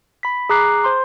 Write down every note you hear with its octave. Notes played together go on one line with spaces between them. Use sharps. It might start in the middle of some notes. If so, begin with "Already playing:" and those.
B5 B6
G#4 A#5 D6 F#6 C7
C5 C6